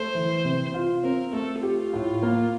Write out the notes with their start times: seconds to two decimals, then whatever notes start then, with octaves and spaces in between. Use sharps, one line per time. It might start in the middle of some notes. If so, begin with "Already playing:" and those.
Already playing: A3 C5
0.15 E3
0.44 C3
0.74 F4
1.03 C4 A#4
1.33 A3 A4
1.63 F4 G4
1.93 A2
2.23 A#3